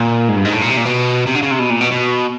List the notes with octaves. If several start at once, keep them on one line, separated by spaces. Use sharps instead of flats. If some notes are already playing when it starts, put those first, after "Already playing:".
Already playing: A#2
G#2
G2
G#2
A2
A#2
C3
A#2
B2
C3
D3
C#3
C3
B2
A#2
B2
B2